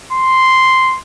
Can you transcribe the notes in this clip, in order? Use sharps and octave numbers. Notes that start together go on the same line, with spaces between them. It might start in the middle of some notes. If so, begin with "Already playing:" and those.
C6